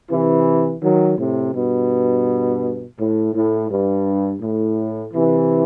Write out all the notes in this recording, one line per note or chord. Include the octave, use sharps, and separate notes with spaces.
C3 E3
D#3 F#3
A2 C3
G2 B2
A2
A2
G2
A2
C3 E3